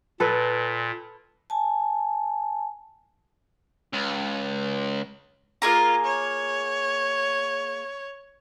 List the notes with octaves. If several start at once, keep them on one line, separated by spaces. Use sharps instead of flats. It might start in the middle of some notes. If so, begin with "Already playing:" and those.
A#2 A4 B4
G#5 A5
C#2
A#3 F4 G#4 A#5
C#5